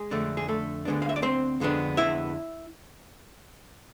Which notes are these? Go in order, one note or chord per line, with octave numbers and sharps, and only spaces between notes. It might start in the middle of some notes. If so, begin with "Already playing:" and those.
Already playing: G#3 G#4
F2 D3 A3 D4
G#4
A3 A4
D2 D3 G#3 B3 D4
F5
E5
D5
C4 C5
F2 D3 G#3 B3 D4
E4 E5